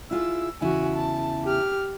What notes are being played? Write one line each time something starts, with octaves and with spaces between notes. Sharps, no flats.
E4 F4 G#4 E6
E2 C#3 E4 F#4 G#5
A5
G4 F6